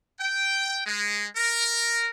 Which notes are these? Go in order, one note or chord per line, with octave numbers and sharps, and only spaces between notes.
G5
G#3
A#4